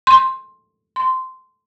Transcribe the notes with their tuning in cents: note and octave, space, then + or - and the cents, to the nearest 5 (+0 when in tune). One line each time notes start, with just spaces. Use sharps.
C6 +15
C6 -10